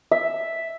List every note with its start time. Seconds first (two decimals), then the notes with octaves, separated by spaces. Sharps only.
0.12 E5